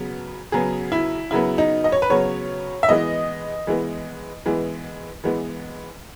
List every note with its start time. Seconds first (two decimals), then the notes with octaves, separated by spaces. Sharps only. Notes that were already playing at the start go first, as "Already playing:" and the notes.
Already playing: C#3 F#3 B3
0.52 C#3 F#3 B3 G#4
0.92 E4
1.31 C#3 F#3 B3 E4
1.58 D#4
1.84 D#5
1.92 C#5
2.02 B4
2.10 C#3 F#3 B3 C#5
2.83 E5
2.89 E3 G#3 B3 D#5
3.67 E3 G#3 B3
4.46 E3 G#3 B3
5.24 E3 G#3 B3